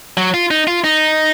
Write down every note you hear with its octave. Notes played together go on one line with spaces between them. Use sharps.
F#3
F4
D#4
F4
D#4